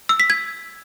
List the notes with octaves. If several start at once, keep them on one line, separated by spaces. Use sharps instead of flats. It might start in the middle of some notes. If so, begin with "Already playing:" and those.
E6
B6
G#6